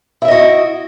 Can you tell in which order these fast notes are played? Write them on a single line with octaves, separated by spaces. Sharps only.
E4 E5 D#5 F#4